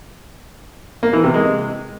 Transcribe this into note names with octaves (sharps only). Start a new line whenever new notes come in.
A#3
E3
C3
G#3